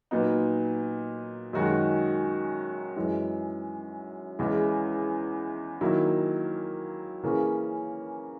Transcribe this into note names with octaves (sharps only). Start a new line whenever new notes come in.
A#2 F#3 B3 D#4
F#2 D#3 G#3 D#4 F#4
F#2 E3 G#3
E2 C#3 E3 G#3
D#3 F#3 A#3 E4
C#3 E3 A#3 C#4